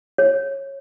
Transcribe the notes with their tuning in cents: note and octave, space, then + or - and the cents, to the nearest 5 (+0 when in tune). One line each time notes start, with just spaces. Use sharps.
C#5 -15